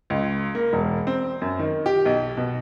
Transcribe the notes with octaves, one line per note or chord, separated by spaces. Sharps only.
C#2
A#3
E1
C4
F#2
D#3
G4
B1
B2